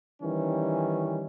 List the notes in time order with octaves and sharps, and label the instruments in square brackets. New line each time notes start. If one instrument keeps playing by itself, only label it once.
[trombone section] D#3 E3 G3 C#4